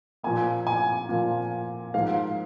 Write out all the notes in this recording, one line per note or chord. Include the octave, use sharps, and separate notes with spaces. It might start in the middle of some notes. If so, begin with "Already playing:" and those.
A#2 F3 A#3 G#5
G#5
A#2 F3 A#3
G#2 F3 A#3 F5